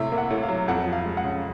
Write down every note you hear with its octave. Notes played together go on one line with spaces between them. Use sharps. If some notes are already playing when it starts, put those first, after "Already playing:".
Already playing: A2 C3 E5
A#3
F#5
A2
F5
F#3
F2 F#5
F3
F5
G#3
F#5
C#3